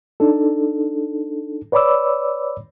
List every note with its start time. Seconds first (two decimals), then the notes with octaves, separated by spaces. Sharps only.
0.20 D4 D#4 A4
1.72 B4 C#5 D5 B5 D6 E6